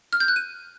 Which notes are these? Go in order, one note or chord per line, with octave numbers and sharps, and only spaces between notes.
F6
G6
F#6
D#7